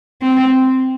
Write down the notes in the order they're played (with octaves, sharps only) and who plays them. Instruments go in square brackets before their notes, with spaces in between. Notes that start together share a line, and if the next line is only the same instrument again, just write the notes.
[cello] C4